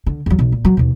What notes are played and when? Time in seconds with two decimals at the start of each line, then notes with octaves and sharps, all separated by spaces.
0.06 D3
0.26 E2 F#3
0.39 B1
0.52 A#2
0.65 F#3
0.77 D#2 B2